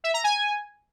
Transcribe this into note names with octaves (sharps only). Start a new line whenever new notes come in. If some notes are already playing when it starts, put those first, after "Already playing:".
E5
A#5
G#5